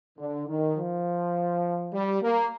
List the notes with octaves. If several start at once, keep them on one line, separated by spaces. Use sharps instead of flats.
D3
D#3
F3
G3
A#3